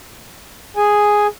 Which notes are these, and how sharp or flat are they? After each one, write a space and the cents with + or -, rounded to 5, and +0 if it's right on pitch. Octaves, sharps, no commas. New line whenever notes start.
G#4 +0 G#5 +0